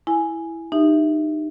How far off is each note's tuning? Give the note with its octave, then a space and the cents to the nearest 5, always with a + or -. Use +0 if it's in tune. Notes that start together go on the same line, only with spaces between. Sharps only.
E4 +0 G#5 +0
D#4 -25 G4 +0 E5 +0